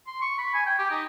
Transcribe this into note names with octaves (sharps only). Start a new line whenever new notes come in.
C6
C#6
B5
G#5
G5
G4
D#4